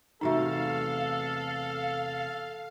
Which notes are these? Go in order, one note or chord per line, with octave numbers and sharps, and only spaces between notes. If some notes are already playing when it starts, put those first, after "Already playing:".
E2 C3 A3 D#4 F#4 A4 E5 F5